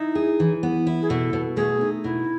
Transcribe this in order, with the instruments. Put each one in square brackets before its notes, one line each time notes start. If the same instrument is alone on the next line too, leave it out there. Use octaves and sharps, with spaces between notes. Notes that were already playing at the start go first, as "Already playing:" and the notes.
Already playing: [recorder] D#4 [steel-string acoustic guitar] E4
[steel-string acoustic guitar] G#4
E3
B3
E4
[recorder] G#4
[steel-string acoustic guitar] B2 [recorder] A4
[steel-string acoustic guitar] B2
[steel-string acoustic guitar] A3 [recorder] G#4
[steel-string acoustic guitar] D#4
[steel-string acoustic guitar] B2 [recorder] E4